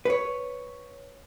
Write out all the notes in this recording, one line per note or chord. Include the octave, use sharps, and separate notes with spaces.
B4 C#5